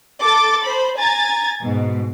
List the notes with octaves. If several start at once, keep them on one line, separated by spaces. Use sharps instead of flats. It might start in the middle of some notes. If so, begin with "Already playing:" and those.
A4 D6 A6
C5 B5
G#5 A#5 G#6 A6
G#2 B2